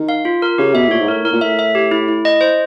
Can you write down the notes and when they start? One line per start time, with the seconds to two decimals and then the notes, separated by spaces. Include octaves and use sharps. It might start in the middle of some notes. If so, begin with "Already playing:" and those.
Already playing: D#3
0.09 F5
0.25 F4
0.42 A#4
0.58 C#3 G4
0.75 B2 E5
0.87 A2
0.91 A#2 C#5
1.00 G#2
1.08 A2 A#4
1.24 A2 A#4
1.33 A#2
1.41 A2 E5
1.59 E5
1.75 G4
1.91 E4
2.08 E4
2.25 D#5
2.41 C5